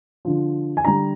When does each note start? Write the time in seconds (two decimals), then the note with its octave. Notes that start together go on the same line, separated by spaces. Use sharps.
0.25 D3 F3
0.77 G#5
0.85 D3 G3 A#5